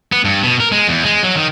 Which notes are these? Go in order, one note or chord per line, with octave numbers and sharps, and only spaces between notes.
B3
G2
B2
A#4
G#3
E2
G#3
F#3
D#3